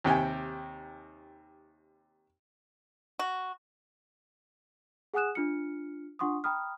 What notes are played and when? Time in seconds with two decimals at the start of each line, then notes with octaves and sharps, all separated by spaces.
0.04 D#2 C3 G5 G#5
3.19 F#4
5.14 G#4 F#5 G#5 D#6 F#6 E7
5.35 D4 F4 F6 C#7
6.19 D4 F4 F#5 C6 C#6 D#6
6.44 G5 A#5 B5 D#6 F6